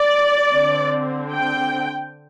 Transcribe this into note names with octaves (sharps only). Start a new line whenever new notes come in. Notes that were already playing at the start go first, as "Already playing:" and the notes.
Already playing: D5
D3 C4
G5